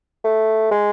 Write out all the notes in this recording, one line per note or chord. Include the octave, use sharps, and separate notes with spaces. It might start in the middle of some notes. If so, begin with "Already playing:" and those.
A3
G#3